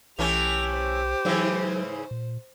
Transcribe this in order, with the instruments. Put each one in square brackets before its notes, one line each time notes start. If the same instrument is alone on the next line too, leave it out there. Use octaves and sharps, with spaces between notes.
[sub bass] B1 [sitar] E3 A3 C#4 [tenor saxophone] G4 [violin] F7
[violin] C5
[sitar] G#2 C#3 E3 [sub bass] F#3
[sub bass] A#2